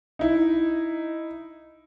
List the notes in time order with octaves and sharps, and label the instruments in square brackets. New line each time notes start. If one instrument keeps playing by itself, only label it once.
[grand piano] D#4 E4